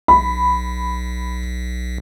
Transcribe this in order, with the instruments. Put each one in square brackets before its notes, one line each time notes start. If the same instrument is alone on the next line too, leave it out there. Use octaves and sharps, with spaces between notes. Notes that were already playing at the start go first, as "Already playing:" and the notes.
[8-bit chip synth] B1 [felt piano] B5